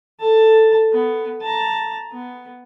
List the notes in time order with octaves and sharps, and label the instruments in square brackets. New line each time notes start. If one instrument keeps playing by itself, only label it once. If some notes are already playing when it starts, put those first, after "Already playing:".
[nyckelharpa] A4 A5
B3
A5 A#5
B3